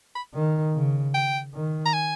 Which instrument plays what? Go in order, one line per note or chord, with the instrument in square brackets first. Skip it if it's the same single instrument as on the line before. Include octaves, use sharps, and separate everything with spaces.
[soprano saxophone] B5
[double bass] D#3
C#3
[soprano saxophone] G5
[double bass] D#3
[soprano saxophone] A#5
G#5